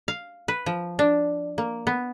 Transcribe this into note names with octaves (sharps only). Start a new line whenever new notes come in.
F5
B4
F3
D4
A#3
B3